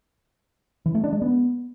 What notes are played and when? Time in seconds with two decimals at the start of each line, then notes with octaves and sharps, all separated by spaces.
0.86 E3
0.95 A3
1.04 D4
1.13 G#3
1.22 B3